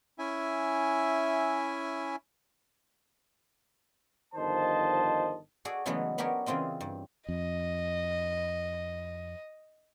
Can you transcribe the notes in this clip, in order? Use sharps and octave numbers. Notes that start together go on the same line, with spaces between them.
C#4 E4 E5 G#5
G1 D#3 F3 C5 D#5 A5
F#4 G#4 A4 D5
C#3 E3 F#3 G#3 A3 B3
F#3 B3 D4 G4 A#4 C#5
C#3 E3 C4 F4 D#5
G2
F2 D#5